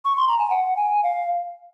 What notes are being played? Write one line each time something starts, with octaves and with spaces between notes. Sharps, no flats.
C#6
C6
A#5
G#5
F#5
G#5
F5